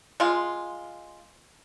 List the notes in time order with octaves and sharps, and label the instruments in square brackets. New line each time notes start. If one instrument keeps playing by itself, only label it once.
[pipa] G#3 F4